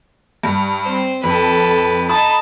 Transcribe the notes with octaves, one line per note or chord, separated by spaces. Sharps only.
G2
C4 C5
F2 A4 B4
D#4 A5 B5 D#6